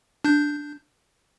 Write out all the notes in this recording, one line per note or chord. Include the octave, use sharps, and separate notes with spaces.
D4 G6